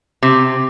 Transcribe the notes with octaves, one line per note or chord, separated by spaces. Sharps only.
C3